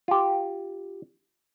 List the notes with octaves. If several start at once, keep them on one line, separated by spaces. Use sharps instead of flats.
F4 G4